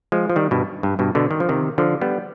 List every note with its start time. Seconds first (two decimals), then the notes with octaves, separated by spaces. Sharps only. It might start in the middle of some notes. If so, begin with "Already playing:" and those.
0.12 F3 G#3
0.30 F3
0.36 D#3 G3
0.51 G2 B2
0.83 G2
0.99 G2 B2
1.15 B2 D3
1.31 D#3
1.40 F3
1.49 C3 D#3
1.78 D3 F3
2.01 G3 B3